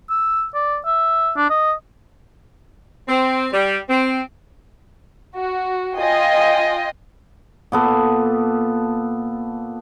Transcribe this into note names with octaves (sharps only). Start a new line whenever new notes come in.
E6
D5
E5
D4
D#5
C4
G3
C4
F#4
F4 D#5 G5 G#5
A#2 B3 A4